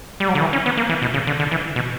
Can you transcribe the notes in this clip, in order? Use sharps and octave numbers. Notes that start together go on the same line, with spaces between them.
G3
F#3
D3
E3
C#4
B3
A#3
E3
B2
C#3
D3
D3
E3
B2